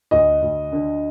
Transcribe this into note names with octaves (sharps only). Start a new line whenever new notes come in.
D2 D#5
D2
D3